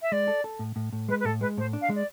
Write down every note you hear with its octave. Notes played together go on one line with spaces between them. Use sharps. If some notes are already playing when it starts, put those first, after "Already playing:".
E5
G#3 D5
A4
A4
A2
A2
A2
G#3 B4
B4
A2 A4
G#3 B4
A2 C5
D4
F5
G#3
D5